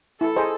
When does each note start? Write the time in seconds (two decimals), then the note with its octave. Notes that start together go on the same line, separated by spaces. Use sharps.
0.21 E4 A4
0.36 G#4 C5 D#5